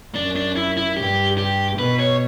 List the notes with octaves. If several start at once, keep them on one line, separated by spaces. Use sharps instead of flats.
F#2 D4
D4
E4
E4
G2 G4
G4
B2 B4
C#5